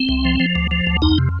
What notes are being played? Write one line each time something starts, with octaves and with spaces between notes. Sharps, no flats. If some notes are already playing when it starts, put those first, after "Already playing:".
Already playing: C4
C2
F3
F3
D2
F3
D2
F2 D#4
C3